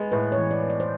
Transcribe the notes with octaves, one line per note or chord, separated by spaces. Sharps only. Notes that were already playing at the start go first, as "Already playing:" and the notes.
Already playing: G#3 B3
A2 B4
C#5
E3
D5
B3
D5
C5